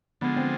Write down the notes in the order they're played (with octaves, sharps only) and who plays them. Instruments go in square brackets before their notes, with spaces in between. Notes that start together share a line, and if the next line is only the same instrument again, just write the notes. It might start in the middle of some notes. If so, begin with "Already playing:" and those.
[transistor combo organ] D3 F3 G#3 [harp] B3
[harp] C4